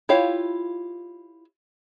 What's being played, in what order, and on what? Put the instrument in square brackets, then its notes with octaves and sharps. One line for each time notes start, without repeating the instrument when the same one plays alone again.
[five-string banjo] E4 F4 G4 C#5 F5